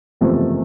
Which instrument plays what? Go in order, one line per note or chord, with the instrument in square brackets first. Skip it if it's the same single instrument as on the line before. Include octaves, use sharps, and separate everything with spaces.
[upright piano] F#1 E2 C3 F3 A3